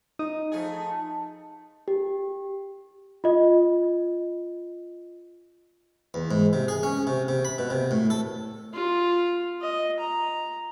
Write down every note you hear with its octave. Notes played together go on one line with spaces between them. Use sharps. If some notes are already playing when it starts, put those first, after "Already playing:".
D#4
F3 A3 G#4
G4
F4 D#5
E2
G#2
C3
G#4
C#4
C3
C3
B5
B2
C3
A2
A4
F4
D#5
A#5